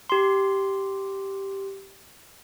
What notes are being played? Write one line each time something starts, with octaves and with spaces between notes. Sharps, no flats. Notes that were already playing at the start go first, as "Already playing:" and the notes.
G4 C6